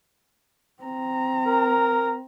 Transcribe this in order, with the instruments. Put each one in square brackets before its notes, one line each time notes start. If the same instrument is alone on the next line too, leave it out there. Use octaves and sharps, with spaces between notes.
[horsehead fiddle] C4 A#5
[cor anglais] A#4